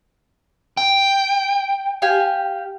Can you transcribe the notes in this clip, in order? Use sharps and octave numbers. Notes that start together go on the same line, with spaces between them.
G5
G4 F5 G#5